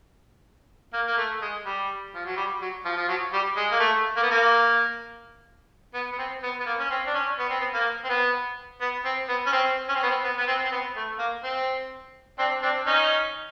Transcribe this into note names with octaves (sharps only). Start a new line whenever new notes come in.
A#3
A#3
A3
G#3
G3
F3
F#3
G3
F#3
F3
F3
F#3
G3
G#3
A#3
A3
A#3
B3
A#3
B3
B3
C4
B3
B3
A#3
C#4
C4
D4
C#4
B3
C4
B3
A#3
C4
B3
B3
C4
B3
C#4
C4
C#4
C4
B3
C4
B3
B3
C4
C4
B3
A3
A#3
C4
C4 D4
C4 D4
C#4 D#4